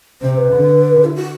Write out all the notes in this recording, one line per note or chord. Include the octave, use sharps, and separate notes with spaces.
C3 C5
B4
D3
E4
F#4